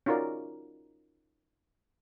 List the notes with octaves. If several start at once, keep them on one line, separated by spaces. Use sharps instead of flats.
C#4 D#4 F4 F#4 A#4 D5